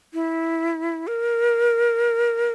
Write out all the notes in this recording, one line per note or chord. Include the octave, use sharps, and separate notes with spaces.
E4
A#4